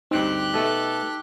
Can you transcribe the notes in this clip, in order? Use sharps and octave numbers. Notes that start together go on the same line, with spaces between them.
D2 G2 C4 D#4 G4 F#6
B2 A3 A4